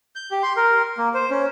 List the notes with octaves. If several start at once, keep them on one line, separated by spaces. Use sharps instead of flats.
G6
G4
C6
A#4
A#3
C5
C#4